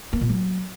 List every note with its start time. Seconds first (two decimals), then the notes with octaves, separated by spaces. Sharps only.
0.13 A#3
0.21 A#2
0.29 F#3